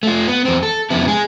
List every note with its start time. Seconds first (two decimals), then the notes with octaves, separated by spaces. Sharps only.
0.03 A3 F4
0.28 B3
0.45 E2 C4
0.63 A4
0.90 F2 C#3 B3 E4
1.08 G#3 G#4